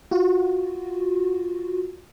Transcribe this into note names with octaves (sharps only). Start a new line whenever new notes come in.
F4 F#4